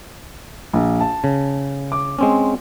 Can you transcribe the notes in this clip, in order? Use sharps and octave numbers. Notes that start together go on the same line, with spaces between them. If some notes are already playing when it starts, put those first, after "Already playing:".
A#1
A5
C#3
D6
G#3 C4 C#4